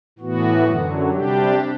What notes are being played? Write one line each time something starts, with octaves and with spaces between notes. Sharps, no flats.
A2 E3 B3 F#4
F#2 D3 F#3
C3 G3 D4 G4